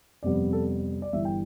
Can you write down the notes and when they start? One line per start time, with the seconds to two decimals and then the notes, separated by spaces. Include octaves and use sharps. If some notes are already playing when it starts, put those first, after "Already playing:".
0.23 F2 C3 G3 B3 D5
0.53 A4
1.02 D5
1.13 G1 G2 E3 E5
1.25 G5